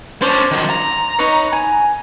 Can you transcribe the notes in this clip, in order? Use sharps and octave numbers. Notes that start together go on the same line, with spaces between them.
C#4 D4 C5 D5
D#3 F#3
A#5
D#4 B4 C#5
G#5